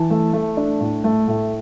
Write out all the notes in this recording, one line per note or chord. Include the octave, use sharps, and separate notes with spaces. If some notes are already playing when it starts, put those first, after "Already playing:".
Already playing: E3 A5
A3
A3
D4
A2
A3
A2